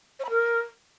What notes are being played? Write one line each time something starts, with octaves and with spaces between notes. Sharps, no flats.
C#5
B5
A#4